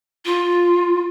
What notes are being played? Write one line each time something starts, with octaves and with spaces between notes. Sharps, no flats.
F4